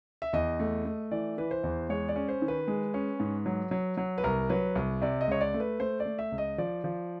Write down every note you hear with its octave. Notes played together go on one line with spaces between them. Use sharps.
E5
E2 D#5
A3
A3
E3 D5
E3 B4
C5
E2
G#3 C#5
D5
C#4
C5
D#3
B4
G#3
C#4
G#2
F#3
F#3
F#3
B4
C2 A#4
F#3 B4
C2
C3 D5
D#5
C#2 C#5
D5
A3
B4
A3 C5
D5
A3
E5
C#2
D#5
F3 D5
F3